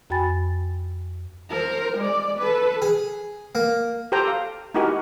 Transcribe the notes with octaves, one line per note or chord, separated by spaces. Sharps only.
F2 F#4 G5 G#5 B5 A6
A#4 C5
G#3 D5
A4 B4
G#4
A#3
G4 A4 C5 G5 A#5
F5
D#4 E4 F#4 G4 A#4 G#5